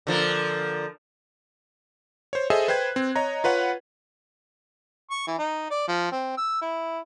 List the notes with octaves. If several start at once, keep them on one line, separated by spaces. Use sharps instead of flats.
D3 F3 A#3
C5 C#5
G#4 A4 C5 D#5 E5
B4 C5 G5 F#6 G#6
C4
C#5 D#5 A#5
F4 B4 C#5 F#5
C#6
E3
D#4
D5
F3
C4
E6
E4